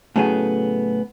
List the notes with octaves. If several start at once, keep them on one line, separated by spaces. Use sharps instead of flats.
A2 C#3 F#3 A3 B3 G#4